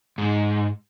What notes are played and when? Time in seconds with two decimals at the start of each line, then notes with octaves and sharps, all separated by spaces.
0.18 G#2